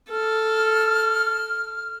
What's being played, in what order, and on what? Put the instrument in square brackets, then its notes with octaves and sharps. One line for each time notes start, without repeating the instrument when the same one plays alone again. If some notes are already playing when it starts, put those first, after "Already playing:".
[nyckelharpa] A4 [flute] F6